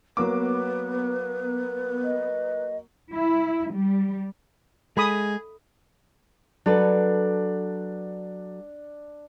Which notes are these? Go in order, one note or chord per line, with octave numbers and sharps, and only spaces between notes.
F#3 A#3 B3 B4 D6
D#5
E4
G3
G#3 G#4 A4 B5 D#6
F#3 D4 A4 B4